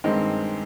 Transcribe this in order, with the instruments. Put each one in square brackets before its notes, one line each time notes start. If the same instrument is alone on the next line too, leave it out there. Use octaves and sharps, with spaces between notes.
[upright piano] G2 D#3 G#3 C4